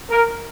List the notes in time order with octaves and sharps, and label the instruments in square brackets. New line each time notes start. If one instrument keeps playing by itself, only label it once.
[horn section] A#4